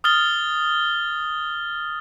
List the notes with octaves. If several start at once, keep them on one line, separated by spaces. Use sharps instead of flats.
D#6 F6 A6 G7